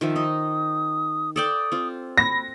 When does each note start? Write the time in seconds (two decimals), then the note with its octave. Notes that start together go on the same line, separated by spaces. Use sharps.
0.01 D#3 F3 E5
0.16 D#4 D#6
1.36 A4 D5 G5 D#6
1.72 C4 F4
2.18 B5 A#6